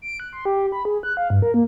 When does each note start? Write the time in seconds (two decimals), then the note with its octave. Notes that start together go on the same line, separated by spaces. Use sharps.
0.02 D7
0.20 F#6
0.33 C6
0.45 G4
0.72 B5
0.85 G#4
1.03 F#6
1.17 F5
1.30 G2
1.42 A#4
1.54 A#3